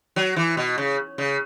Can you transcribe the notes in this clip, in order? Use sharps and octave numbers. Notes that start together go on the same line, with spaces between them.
F#3
E3
B2
C#3
C#3